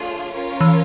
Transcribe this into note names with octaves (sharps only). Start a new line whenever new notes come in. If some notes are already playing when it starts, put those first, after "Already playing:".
Already playing: A3 D4 F4 G#4 C#5
C#4 F4 A#4 C#5
E3